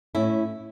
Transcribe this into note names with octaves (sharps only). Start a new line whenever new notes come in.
A2 C#4 E4